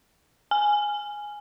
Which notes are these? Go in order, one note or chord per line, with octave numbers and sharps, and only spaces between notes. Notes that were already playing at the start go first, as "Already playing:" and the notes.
G#5